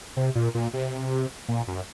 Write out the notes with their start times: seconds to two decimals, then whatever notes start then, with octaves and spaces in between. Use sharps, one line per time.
0.17 C3
0.35 A#2
0.55 A#2
0.74 C3
1.49 A#2
1.68 F#2